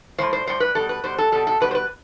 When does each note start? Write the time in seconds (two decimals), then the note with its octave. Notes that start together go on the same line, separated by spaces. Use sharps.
0.18 A2 E3 G3 C5
0.33 C5
0.47 A2 E3 G3 C5
0.60 B4
0.75 B2 G3 A4
0.89 B4
1.04 B2 G3 C5
1.18 A4
1.32 B2 G3 A4
1.47 A4
1.60 B2 G3 B4
1.71 C5
1.75 B4